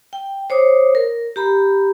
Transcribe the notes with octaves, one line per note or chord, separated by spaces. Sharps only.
G5
C5 C#5 D6 D#6
A#4
G4 A#5 B5